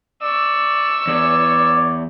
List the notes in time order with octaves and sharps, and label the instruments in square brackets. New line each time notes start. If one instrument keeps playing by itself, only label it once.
[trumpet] D5 [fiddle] C#6 E6
[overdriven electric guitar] E2 [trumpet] C#5 [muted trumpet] D5